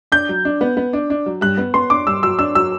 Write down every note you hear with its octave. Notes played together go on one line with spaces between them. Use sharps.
D4 G6
F#3
D4
B3
B3
D4
D4
F#3
G2 F#6
B3
B3 C6
D4 D6
G2 E6
F#3 E6
D4 E6
F#3 E6